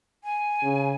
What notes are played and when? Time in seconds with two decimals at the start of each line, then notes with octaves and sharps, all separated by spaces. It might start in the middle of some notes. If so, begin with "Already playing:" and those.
0.24 G#5
0.63 C#3